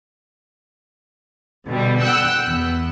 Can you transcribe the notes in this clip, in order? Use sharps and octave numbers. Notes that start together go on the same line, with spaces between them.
B2 D3 G3
F#5 G5 E6 F#6
E2 B3